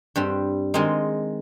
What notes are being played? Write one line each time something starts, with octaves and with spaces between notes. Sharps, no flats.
G2 G3 C4
D#3 G#3 C4 D#4